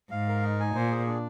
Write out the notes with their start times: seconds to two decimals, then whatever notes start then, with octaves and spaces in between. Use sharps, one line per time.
0.11 G#2 F5
0.28 A#4
0.43 D#4
0.60 G#5
0.75 A#2 C5
0.91 G#4
1.07 D4